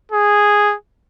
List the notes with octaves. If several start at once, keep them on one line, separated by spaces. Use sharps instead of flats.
G#4